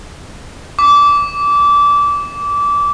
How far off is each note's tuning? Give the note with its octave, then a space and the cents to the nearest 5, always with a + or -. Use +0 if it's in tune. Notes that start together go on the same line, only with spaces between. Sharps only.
D6 -20